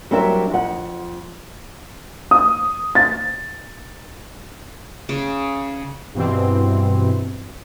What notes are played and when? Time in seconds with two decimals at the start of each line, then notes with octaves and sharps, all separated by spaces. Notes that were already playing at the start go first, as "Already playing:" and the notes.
0.11 F#3 G3 C4 D4 A#4 E5
0.51 F2 F#5
2.31 D#6
2.95 A6
5.09 C#3
6.14 G2 B2 E3 C4